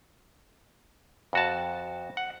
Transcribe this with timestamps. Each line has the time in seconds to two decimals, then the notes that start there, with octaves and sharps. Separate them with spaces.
1.33 F2 F#4 A5
2.17 F#5